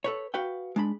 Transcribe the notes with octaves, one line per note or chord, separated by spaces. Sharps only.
A4 B4 C#5
F#4 B4 F5 G5
G#3 D4 B5